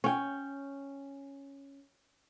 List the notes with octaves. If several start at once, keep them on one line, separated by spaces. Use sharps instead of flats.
C#4 G5